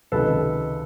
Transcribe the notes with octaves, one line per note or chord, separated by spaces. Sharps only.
C#2 C3 D#3 A4 B4